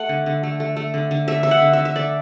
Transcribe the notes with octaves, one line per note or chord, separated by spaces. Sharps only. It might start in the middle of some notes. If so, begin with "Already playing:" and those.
Already playing: A3 F#5
D3
D3
A3
A3
A3
D3
D3
A3 E5
D3 E5
F#5
D3
E5
D3
E5
A3 D5